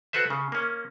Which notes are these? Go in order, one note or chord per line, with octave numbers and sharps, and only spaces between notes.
F#4 A4 B4 C5 E5
C#3
A#3 C#4